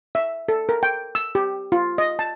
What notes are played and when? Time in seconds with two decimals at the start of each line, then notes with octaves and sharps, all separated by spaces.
0.15 E5
0.49 A4
0.69 A#4
0.83 G5
1.15 E6
1.35 G4
1.72 F4
1.98 D#5
2.19 A5